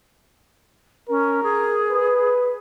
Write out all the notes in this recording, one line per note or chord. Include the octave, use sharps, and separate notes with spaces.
C#4 A#4
G#4
B4